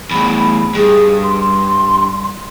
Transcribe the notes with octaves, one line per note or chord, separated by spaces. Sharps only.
E2 A2 B5
G2 G#4
C6